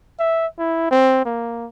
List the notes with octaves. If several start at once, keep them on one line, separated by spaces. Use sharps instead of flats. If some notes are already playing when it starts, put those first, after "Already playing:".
E5
E4
C4
A#3